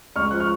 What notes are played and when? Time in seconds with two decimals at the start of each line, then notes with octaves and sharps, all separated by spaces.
0.16 C#2 C#6 F6
0.31 F3 F#6
0.40 C#6 F6